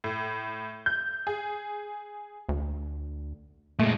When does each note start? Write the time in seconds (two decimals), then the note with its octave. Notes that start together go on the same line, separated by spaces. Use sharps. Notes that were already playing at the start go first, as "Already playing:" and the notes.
0.04 A2
0.86 G6
1.27 G#4
2.49 D2
3.79 A#2 G#3 A3